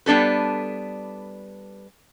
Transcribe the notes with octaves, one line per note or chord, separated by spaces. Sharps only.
G3 B3 D4 A4 B4